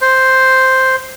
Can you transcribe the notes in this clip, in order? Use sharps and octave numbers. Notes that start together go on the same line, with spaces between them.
C5